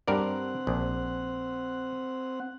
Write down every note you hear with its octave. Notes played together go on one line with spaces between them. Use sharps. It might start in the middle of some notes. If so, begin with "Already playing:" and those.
G2 C4 A#4 D5 F#5
A#1